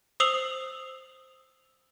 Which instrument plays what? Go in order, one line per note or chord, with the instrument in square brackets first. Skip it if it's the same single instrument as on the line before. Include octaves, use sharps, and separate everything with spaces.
[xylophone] C5 D#6 E6 C7 F7 F#7